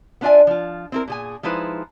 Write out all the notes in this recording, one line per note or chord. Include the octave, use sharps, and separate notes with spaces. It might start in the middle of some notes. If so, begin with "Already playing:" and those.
B3 D4 F4 D5 E5 G#5
F3 F4
C4 E4 A#4
A#2 G#4 G#5
F3 G#3 D#4 E4 B4 C5